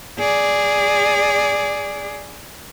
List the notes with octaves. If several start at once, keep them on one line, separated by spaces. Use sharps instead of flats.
G#4 D5